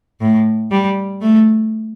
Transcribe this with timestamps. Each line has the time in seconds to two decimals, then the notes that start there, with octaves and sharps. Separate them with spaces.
0.21 A2
0.71 G3
1.22 A3